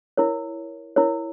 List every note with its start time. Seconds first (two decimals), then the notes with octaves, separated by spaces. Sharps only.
0.17 E4 A#4 C#5
0.96 E4 A#4 C#5